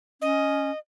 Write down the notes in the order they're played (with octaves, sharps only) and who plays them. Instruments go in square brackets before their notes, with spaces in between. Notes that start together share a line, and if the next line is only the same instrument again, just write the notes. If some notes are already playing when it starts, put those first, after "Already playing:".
[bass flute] C#4 [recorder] D#5